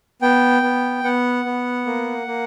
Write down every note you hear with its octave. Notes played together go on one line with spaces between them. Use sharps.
B3 G5
B3
B3 F#5
B3
A#3
A#3